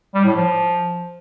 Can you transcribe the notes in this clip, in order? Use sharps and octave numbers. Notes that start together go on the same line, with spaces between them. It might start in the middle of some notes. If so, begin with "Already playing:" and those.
G3
A2
F3